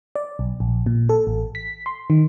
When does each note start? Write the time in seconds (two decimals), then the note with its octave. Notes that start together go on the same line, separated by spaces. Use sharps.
0.16 D5
0.39 B1
0.60 A#1
0.86 A#2
1.09 A4
1.27 A1
1.55 B6
1.86 C6
2.10 D#3